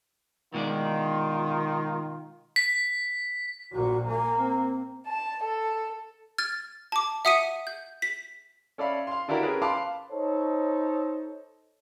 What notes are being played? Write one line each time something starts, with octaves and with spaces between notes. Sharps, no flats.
B2 D#3 G#3 F4 D5
B6
A#1 A#2 F#4
A#3 G#5
C4
A5
A4
F6 G#6 A6
A5 D6
E5 F#5 D#6 B6 C#7 D#7
G6
B6
C#4 A4 D5 E5 F5 B5
F5 C6
D3 D4 E4 F#4 G4 A#4
C#4 G#4 A#4 B4
F5 A5 B5 C6 D6
D#4 A4 C5 C#5